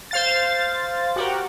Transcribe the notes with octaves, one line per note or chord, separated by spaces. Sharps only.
C5 F5 A6
F#4 G4 A#4